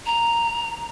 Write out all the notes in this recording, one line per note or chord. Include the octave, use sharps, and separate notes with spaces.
A#5